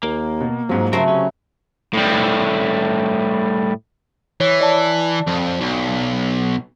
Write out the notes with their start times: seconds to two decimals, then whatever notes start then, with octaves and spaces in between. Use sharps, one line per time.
0.03 D#2 A#3
0.41 B2
0.69 G#2 F3 F#3
0.93 C#3 F#3 A3 C4 A#4 C5
1.08 C3 C#4
1.93 A2 G3
4.40 E3 C#5
4.61 D5 A5
5.27 F2
5.61 B1